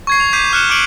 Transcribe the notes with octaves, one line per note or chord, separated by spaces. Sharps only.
C#6 G#6 C7
F7
D6 G6 G#6 B6 C7 D#7
C#6 F6 F#6 C#7 E7 G7
C#6 D6 C#7 D7 F#7 G7